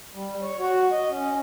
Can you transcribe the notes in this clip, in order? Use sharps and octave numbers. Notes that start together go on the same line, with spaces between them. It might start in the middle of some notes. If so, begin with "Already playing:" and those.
G3
C#5
F#4
D#5
C#4